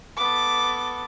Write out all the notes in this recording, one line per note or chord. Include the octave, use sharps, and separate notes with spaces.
B3 A4 D6